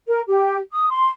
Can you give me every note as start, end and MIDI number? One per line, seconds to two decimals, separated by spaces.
0.08 0.20 70
0.28 0.57 67
0.71 0.90 87
0.90 1.08 84